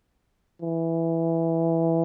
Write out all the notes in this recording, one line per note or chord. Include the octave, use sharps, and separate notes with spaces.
E3